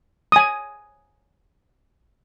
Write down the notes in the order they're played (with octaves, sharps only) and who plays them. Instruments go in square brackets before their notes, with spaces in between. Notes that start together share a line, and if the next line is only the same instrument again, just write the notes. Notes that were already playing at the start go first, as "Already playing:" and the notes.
[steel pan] G#5 D#6